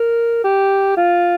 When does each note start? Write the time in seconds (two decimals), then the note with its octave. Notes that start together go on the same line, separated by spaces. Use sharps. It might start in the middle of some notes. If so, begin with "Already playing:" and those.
Already playing: A#4
0.44 G4
0.97 F4